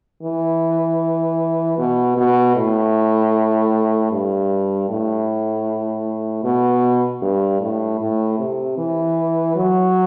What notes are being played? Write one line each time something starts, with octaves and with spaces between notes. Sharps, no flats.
E3
B2
B2
A2
G2
A2
B2
G2
A2
A2
C3
E3
F#3